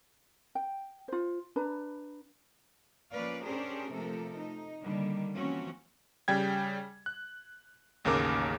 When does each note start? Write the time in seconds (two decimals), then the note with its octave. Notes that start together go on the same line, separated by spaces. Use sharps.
0.55 G5
1.08 F4 C5
1.56 D4 B4 A#5
3.12 F3 A#3 C#4 B4 D5 F5
3.45 C#4 D4 G4 G#4 A#4 C5
3.91 C3 F3 A3 A#3 A4 A#4
4.38 D#4
4.81 D3 D#3 G3 A#3
5.34 E3 F3 A#3 C4 C#4 F#4
6.28 C#3 G3 G5 G#6
7.06 F#6
8.05 A1 D#2 C#3 A#3 A#4 D6